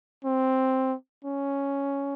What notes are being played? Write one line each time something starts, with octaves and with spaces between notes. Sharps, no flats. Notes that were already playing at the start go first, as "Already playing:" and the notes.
C4
C#4